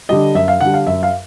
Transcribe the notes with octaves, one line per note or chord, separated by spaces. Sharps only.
D3 G3 D#5
F#2 E5
F5
D3 G3 F#5
F5
F#2 E5
F5